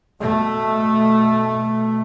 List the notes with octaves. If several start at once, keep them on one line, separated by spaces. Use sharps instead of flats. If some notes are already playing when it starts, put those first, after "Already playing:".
B2 A3